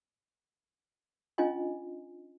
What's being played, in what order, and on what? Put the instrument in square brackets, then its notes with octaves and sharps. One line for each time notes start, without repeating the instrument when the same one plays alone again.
[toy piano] C#4 D4 F4 D#5 G#5 C6